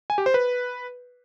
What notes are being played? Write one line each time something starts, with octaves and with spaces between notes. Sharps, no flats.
G#5
G4
C5
B4